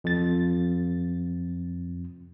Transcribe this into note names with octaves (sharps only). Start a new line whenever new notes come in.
F2 A6